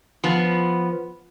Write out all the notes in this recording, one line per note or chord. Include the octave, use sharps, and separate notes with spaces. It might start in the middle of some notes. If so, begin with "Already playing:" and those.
F3 B3